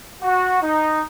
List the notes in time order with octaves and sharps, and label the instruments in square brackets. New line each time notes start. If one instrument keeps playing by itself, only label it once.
[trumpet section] F#4
D#4